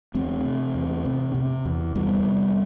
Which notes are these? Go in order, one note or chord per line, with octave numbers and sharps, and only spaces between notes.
E2 A3 C4
C3
E2
C3
C3
E2
E2 G3 B3
C3